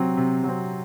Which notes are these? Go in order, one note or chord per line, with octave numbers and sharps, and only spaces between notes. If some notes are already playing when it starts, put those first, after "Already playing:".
Already playing: C3 F#3 C4
C3
F#3 C4